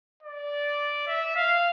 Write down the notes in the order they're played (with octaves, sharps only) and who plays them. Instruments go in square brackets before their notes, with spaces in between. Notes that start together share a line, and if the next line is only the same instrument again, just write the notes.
[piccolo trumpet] D5
E5
F5